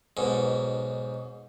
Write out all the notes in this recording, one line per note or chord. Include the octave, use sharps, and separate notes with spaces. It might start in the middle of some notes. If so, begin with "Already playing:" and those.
B1 G#2